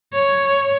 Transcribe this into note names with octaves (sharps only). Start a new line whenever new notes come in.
C#5